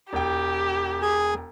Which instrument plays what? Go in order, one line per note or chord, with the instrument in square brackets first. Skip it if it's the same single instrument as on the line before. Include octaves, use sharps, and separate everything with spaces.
[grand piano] E1 G5 [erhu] G4
[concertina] G#4 G#5